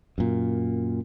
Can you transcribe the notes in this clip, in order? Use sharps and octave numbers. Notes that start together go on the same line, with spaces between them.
F#2 A#2